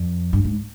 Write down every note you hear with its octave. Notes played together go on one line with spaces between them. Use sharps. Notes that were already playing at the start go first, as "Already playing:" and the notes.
Already playing: F2
G2
G#2